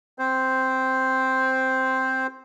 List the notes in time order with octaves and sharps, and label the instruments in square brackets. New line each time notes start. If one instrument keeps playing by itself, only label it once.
[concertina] C4 C5